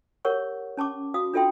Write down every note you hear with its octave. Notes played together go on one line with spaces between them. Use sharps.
G4 A#4 C#5 F#5 C#6
C#4 A5 C#6 D6
F#4 F5 D#6
D4 F4 A4 E5 G5 C6